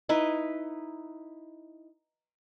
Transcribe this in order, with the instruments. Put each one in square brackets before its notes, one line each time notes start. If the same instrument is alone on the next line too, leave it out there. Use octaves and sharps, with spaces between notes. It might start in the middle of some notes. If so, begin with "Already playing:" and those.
[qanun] D#4 E4 B4